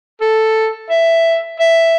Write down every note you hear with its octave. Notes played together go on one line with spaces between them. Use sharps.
A4
E5
E5